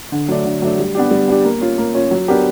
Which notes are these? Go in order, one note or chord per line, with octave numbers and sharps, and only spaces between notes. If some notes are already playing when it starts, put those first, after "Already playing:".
D3
F#3 A3 D4
D3
F#3 A3 D4
G3
B3 D4 G4
G3
B3 D4 G4
A#3
C#4 F4
A#3
C#4 F4
F#3
B3 D4 G4 A#4